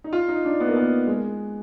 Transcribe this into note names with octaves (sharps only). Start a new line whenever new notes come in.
D#4
F4
D#4
D4
B3
A#3
B3
G#3